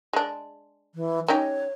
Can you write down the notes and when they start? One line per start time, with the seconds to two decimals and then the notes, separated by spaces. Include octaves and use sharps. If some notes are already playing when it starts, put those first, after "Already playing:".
0.13 G#3 D4
0.95 E3
1.28 C#4 D#4 G4 C#5